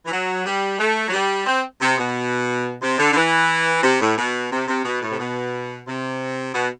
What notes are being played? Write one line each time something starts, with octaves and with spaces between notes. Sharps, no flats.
E3
F#3
G3
A3
F#3
G3
C4
C3
B2
C3
D3
D3
E3
C3
A2
B2
C3
C3
B2
A2
C3
B2
C3
B2